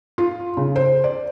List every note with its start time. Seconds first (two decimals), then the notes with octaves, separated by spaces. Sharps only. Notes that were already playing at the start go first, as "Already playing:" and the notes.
0.18 F4
0.57 C#3
0.76 C5
1.04 D5